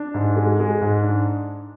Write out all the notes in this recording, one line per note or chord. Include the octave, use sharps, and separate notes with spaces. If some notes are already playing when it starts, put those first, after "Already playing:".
Already playing: D4
G#2
G#3
G#3
G#2
D4